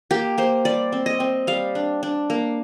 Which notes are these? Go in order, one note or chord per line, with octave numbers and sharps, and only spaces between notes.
A#3 G4
A#3 C5
G3 D5
C4
D#5
C4
G3 F5
D4
D4
A#3